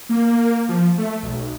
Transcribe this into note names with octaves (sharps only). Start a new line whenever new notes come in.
A#3
F3
A3
B1